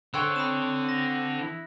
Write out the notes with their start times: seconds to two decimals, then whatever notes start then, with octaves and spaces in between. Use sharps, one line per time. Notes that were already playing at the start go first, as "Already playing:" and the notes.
0.14 D3 C5 C#5 G5 E6 F#6
0.36 C4 B5 D#6 E7
0.89 A#6
1.41 E4